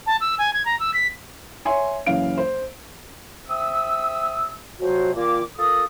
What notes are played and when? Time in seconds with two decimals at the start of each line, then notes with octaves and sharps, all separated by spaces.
0.07 A5
0.21 E6
0.39 G#5
0.54 G#6
0.65 A#5
0.80 E6
0.94 B6
1.65 C#5 E5 G#5 C6
2.06 F#1 E3 C#4 F5 D7
2.38 C5
3.48 C4 E5 D#6 E6
4.80 F2 C3 F#3 F#4 C5 C#5
5.15 A#2 D#3 A#3 F4 D6
5.56 F4 A4 A#4 D#6